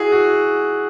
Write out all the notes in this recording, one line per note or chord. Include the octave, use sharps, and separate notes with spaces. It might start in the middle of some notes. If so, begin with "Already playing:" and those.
Already playing: E4 F#4 G#4
F#4